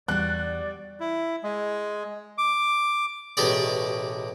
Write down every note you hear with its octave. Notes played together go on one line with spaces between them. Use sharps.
E2 G3 F#4 D5 F#6
E4
G#3
D6
A1 B2 G#3 G4 G#4 D5